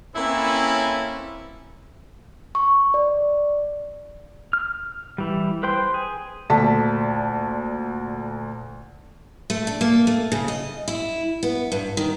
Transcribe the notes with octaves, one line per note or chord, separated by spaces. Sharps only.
A#3 C4 C#4 E4 A4 B4
C#6
D5
F6
E3 G3
B4 C5 G5 C6
G#4
D2 A#2 A4 A5 B6
A3
D4
A#3
A3
C#3
D#5
E4
B3
G2
D#3